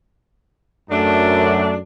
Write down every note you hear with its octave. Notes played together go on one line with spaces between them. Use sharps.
F#2 A3 D4